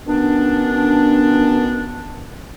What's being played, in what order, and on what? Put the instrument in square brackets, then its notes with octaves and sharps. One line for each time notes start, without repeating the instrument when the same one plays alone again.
[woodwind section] B2 D#3 B3 C#4 D4